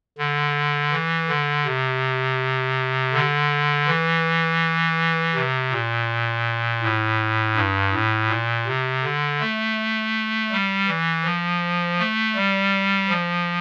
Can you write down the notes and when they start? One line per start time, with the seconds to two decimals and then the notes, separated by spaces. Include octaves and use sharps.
0.18 D3
0.92 E3
1.29 D3
1.65 C3
3.13 D3
3.87 E3
5.34 C3
5.71 A#2
6.82 A2
7.56 G2
7.93 A2
8.29 A#2
8.66 C3
9.04 D3
9.40 A3
10.51 G3
10.88 E3
11.25 F3
11.99 A3
12.36 G3
13.09 F3